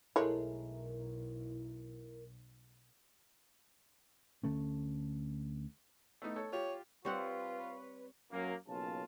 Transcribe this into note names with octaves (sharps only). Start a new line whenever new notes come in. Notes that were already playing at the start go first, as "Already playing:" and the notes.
B1 G#3 A3 E4 A#4 C#5
D2 D3 A3 C#4
A3 B3 D#4
A4 C#5
F4 G4 C#5
G3 C4 F4 B4 C#5 F#5
F#2 F#3 A#3
B1 C#3 A#3 F4 A5